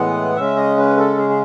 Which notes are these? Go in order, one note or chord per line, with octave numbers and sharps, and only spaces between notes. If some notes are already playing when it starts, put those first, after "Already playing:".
Already playing: A2 E3 G#3 B3 F#5
C#3 G#3 C#4 E5
D#5
B4
A4
G#4
G#4